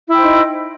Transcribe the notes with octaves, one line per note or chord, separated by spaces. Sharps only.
D#4 E4 C5 G5